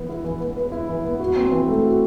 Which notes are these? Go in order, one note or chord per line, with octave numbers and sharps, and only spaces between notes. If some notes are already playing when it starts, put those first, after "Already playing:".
Already playing: E3 B3 B4
E4
E3
B3
B4
E4
E3
B3
F#4
C4
E3
A3
F#4